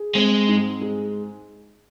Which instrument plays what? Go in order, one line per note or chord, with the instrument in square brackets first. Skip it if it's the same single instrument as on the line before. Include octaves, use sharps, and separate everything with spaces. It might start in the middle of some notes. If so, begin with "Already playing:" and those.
Already playing: [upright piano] G#4
[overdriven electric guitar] G#3 [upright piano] C4
[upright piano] G#2
G#3